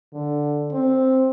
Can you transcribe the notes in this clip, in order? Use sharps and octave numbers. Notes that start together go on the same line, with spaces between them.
D3
C4